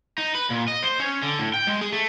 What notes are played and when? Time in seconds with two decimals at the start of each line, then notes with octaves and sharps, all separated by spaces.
0.18 D#4
0.35 B4
0.50 A#2
0.68 D#5
0.83 C5
1.00 C#4
1.23 D3
1.39 A2
1.54 G5
1.67 G#3
1.81 G#4
1.92 A3